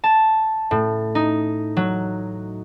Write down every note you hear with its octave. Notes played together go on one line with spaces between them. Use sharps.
A5
A2
D#4
F#3